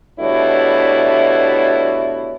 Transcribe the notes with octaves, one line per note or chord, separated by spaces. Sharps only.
D2 B2 G3 E4 C#5